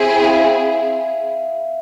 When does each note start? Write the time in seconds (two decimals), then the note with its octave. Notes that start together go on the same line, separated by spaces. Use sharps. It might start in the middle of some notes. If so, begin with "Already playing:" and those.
Already playing: C4 E4 G#4 E5
0.24 F5